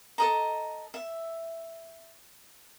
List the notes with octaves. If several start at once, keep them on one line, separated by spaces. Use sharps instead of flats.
A4 D#5 A#5
E5